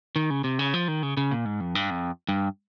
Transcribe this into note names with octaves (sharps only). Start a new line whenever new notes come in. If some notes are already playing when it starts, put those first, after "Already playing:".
D#3
C#3
C3
C#3
F3
D#3
C#3
C#3
A#2
G#2
F2
G2
F2
G2